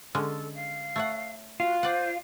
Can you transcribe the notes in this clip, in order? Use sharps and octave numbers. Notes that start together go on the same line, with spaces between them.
D3 G#3 C#4 A4
F5
A3 C#5 F#5
F4 F#4
C5 D5 F#5